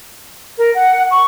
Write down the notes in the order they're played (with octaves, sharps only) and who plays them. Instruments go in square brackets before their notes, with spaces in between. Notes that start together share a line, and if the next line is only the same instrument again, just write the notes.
[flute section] A#4
F#5
C#6